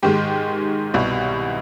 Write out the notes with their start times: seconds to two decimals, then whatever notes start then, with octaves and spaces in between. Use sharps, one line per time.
0.03 G#2 D#3 G#3 G4
0.94 C2 B2 G3